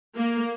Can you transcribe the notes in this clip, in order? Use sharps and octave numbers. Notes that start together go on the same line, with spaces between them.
A#3